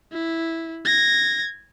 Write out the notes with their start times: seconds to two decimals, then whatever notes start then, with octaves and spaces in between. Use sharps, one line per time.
0.12 E4
0.85 G#6 A#6